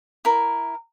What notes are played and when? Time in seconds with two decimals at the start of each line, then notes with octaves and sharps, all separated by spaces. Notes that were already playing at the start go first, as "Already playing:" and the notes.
0.25 E4 A#4